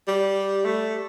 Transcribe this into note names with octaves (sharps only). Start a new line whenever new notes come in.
G3
A3